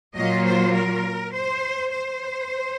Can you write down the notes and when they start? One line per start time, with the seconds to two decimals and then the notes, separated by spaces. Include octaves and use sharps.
0.16 A#2 F#3 A#3 F4 D#5
0.45 C5
0.74 A#4
1.33 C5
1.91 C5